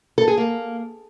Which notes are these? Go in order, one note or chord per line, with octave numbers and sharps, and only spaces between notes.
A4
G#4
A#3